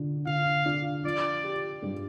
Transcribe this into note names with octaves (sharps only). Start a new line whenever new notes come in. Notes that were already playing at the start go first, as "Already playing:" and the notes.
Already playing: D3
D3 F5
D4
F3 D5
G4
G2